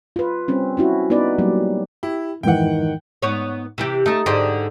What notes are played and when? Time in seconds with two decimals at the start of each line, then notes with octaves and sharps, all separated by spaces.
0.16 F4 B4
0.48 G3 C4 C#4
0.77 C#4 E4 F#4
1.10 B3 D#4 B4 D5
1.38 F#3 G3 A#3
2.03 E4 G4
2.43 F2 G#2 D#3 E3 F#5 G5
3.22 G#2 B3 C#5
3.78 C3 E3 G4
4.06 A3 D#4 A4
4.26 G#2 D3 G4 D#5